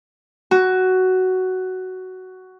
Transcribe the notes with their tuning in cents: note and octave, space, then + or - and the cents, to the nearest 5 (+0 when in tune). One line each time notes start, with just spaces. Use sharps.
F#4 +10